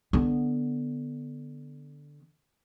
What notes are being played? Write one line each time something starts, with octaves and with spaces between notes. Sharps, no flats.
D3 B3